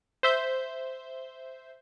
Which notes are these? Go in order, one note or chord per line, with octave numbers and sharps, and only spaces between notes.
C5 E5 G6